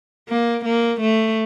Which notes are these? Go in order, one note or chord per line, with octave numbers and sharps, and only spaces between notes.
A#3
A#3
A3